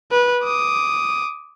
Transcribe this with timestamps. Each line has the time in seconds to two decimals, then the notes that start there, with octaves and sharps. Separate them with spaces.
0.11 B4
0.44 D6 D#6